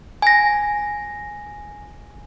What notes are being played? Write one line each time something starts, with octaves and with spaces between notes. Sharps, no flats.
G#5 A#6